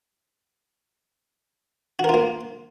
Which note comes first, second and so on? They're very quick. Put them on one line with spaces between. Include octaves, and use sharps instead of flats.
F#4 A#4 F4 A#3